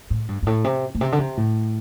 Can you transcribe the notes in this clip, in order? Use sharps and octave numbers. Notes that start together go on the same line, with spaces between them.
A2
G2
G2
A2
C3
A2
C3
D3
C3
A2